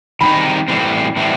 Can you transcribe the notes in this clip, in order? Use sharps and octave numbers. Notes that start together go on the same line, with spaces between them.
D#3 G3 C4 D#4 B5
A2 E3 G3 C4
A2 E3 G3 C4